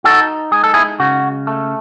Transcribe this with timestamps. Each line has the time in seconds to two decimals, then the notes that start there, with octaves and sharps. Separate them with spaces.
0.04 D#4 F#4 A4
0.52 G#3 G#4
0.64 A4
0.74 E4 G#4
1.00 C#3 F#4
1.47 A3